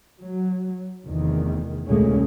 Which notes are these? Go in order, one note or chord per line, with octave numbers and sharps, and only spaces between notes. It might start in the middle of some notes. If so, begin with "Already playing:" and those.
F#3
F1 E2 D#3
F1 D2 A#2 G#3 A3 C#4